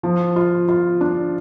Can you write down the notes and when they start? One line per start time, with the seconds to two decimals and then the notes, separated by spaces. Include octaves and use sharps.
0.03 F3
0.36 F4
0.68 F4
1.01 D4